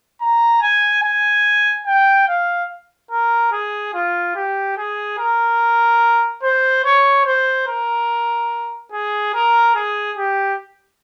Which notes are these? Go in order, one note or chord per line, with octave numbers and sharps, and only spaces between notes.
A#5
G#5
G#5
G5
F5
A#4
G#4
F4
G4
G#4
A#4
C5
C#5
C5
A#4
G#4
A#4
G#4
G4